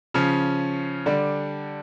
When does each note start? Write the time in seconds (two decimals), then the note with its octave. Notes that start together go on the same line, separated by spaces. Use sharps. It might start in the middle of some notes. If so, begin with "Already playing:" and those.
0.14 C#3 F3 C#4
1.06 D3 G3 D4